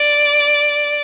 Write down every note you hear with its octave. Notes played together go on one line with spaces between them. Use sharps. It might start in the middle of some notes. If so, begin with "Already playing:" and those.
Already playing: D5